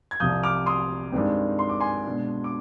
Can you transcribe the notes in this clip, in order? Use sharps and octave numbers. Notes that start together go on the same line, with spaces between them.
G#6
C2 C3 F3 D#6 G6
D6 F6
C6 D#6
G2 D#3 G#3 C4
C6
D6
G#5 C6
B2 G#3 D4
D6